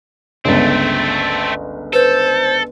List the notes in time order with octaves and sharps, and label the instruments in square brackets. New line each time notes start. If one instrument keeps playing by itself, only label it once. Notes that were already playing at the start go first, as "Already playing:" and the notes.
[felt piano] G1 C#2 [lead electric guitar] A3 C4 [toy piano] C#5
[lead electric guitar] A4 [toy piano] B4 [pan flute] C5